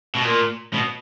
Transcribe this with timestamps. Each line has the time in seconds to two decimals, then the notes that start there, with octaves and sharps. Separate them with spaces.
0.15 B2
0.24 A#2
0.74 B2